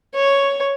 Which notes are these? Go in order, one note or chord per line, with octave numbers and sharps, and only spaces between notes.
C#5